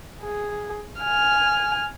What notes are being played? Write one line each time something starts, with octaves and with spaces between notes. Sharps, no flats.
G#4
G#5 F6